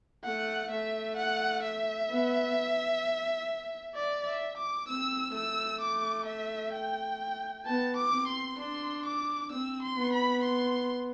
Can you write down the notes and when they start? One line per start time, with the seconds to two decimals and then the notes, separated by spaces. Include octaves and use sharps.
0.24 A3 F#5
0.71 A3 E5
1.17 F#5
1.63 E5
2.10 B3
3.95 D5
4.26 E5
4.58 D6
4.87 C4 E6
5.34 A3 E6
5.81 D6
6.26 E5
6.73 G5
7.66 B3 A5
7.97 D6
8.12 C4
8.27 C6
8.58 D4 C6
9.06 D6
9.52 C4 E6
9.83 C6
9.98 B3
10.13 B5
10.44 C6